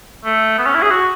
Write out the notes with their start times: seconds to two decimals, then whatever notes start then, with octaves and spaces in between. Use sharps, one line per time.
0.25 A3
0.58 B3
0.66 C#4
0.75 E4
0.82 G#4
0.90 F#4